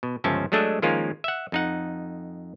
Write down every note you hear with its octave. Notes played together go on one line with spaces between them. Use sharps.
B2
G1 C#2 F3 C#4 E5 A5
F#3 G#3 A3 D4 D#5 E5
D#3 F3 G#3 A#3 C#4 F4
E5 F#5
F2 D#4 F#5